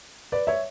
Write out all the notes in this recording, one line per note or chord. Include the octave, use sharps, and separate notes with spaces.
B4 D5
C#5 E5